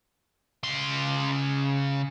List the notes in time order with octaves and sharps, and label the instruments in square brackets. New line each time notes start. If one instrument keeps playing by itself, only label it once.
[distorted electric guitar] C#3 C6